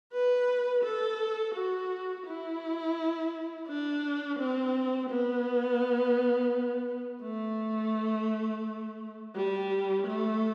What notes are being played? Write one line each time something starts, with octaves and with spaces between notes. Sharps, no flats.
B4
A4
F#4
E4
D4
C4
B3
A3
G3
A3